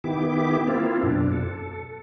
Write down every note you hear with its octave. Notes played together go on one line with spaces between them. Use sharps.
D#3 B3 E4 G4 D6
A#3 C4 E4 F4
F#2 B2 D4
A4